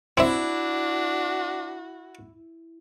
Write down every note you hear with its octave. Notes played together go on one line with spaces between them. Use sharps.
C4 D4 E4 F#4 E5